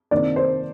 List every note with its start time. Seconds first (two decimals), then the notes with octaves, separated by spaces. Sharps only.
0.11 C3 D#3 A#3 D4 D5
0.36 C5